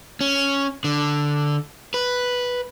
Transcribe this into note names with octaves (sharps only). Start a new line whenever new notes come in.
C#4
D3
B4